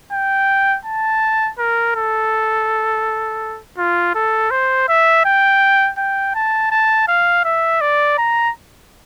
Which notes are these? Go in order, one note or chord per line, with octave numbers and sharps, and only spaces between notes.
G5
A5
A#4
A4
F4
A4
C5
E5
G5
G5
A5
A5
F5
E5
D5
A#5